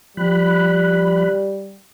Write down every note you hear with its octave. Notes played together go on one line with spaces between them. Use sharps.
F3 G3 B5 F#6